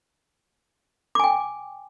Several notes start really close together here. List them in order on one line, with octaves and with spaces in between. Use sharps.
D6 G#5 G5